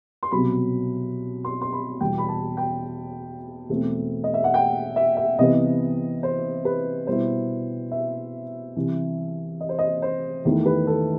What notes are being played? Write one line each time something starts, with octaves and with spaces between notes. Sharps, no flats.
C6
C2 B2 F#3 B5
C6
C6
B5
E2 B2 G3 G5
B5
A5
G5
E2 B2 A3 C4
D#5
E5
F#5
G5
E5
E5
C2 C3 E3 B3 D#5
C5
B4
B2 G3 B3 E4 C5
E5
C2 C3 E3
D#5
C5
D#5
C5
E2 D#3 A3 E4
B4
A4